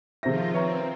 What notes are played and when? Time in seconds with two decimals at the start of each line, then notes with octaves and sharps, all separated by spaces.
0.23 C3 D#3 F3 F4 G#4 C5 E5 A#6
0.54 C4 B4 C#5 E5 A#5